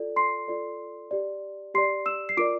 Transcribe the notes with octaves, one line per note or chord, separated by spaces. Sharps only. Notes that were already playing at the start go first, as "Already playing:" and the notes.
Already playing: F4 A4 D5
C6 C7
F4 A4 D5
G4 D5
G4 D5 C6 C7
E6 E7
C7
F4 A#4 D5 D6 D7